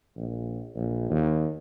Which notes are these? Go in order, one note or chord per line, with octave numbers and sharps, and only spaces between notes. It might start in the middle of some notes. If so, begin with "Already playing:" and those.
A#1
A#1
D#2